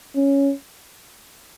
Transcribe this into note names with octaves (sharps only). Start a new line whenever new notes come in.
C#4